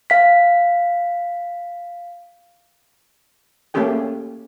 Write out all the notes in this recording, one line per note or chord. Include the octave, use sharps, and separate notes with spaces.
F5 B6
A3 A#3 C#4 G4 G#4 G5